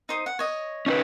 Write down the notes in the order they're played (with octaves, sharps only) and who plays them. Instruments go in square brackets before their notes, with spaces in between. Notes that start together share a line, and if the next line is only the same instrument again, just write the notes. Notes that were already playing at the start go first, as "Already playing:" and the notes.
[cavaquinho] D#4 C5 D#6
F#5
C#5 D#5
[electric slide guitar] C#4 D#4 B4